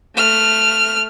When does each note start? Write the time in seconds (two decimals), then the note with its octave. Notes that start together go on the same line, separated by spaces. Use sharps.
0.16 A3 F6